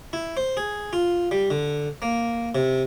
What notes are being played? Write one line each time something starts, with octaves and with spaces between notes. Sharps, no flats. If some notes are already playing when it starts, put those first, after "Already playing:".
E4
C5
G#4
F4
G3
D3
A#3
C3